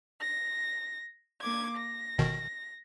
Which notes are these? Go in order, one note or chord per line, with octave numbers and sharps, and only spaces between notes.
A#6
A#3 D6 G#6
A#6
G1 B2 D#3